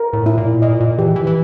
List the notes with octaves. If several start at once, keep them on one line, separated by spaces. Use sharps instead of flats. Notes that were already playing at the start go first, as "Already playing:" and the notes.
Already playing: A#4
A2
E4
A#2
A#2 D#5
A#2
E3 G4
E3
E3